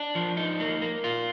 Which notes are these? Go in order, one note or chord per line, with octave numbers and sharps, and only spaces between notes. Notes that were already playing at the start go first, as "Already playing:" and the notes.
Already playing: D4
F3
D#4
A#3
A#3
F4